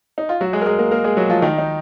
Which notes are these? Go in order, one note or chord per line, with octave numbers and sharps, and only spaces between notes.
D#4
F4
F#3 F#4
G#3 G#4
A#4
G#3 G#4
A#3 A#4
A#3 A#4
G#3 G#4
F#3 F#4
F3 F4
D#3 D#4
D#4